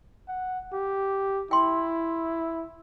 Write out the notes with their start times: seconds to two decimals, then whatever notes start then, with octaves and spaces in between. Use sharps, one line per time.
0.28 F#5
0.73 G4
1.51 E4 G5 C6